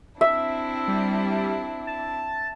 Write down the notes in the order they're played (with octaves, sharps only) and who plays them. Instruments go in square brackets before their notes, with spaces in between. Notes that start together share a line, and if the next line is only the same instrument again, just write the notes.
[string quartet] C4 D4 E4 [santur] E5
[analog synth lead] G3
A5